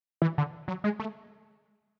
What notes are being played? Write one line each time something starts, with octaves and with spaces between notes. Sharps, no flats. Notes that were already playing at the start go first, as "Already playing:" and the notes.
E3
D3
F#3
G#3
A3